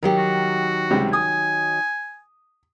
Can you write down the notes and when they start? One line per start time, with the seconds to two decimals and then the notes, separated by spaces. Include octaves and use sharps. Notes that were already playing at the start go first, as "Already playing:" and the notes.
0.03 D#3 F#3 G4 A#4
0.18 F#4
0.91 C#2 C3 G3
1.13 G#5 D#6